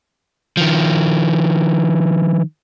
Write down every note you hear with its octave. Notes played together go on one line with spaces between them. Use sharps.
D#3 F3